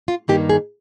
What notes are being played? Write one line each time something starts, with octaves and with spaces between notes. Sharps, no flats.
F4
G2 D#3 A#3 D#4 G4
G#4